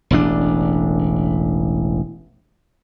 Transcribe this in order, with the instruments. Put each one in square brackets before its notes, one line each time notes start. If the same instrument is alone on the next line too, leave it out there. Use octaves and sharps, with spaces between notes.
[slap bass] E1 A1 D4